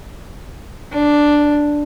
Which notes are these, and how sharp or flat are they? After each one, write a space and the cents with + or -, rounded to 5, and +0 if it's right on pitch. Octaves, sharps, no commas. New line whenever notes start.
D4 +0